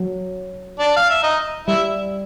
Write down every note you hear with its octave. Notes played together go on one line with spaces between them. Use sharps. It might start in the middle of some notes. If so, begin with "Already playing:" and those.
Already playing: F#3
D4 D5
F5
E5
D#4 D#5
G3 E4 E5